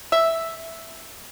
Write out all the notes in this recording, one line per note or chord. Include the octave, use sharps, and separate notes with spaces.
E5